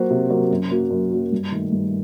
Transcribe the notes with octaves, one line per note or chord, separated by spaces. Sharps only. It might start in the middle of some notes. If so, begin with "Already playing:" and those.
Already playing: F#3 A#3 F#4 C5
C3
F#3 A#3 F#4 C5
F#2
F#3 A#3 F#4
F#2
F#3 A#3 F#4
G2
D#3 A3
G2